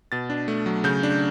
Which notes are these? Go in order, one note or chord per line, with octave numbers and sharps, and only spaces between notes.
B2 A6
D4
A3
F#3
C#3 G6
D4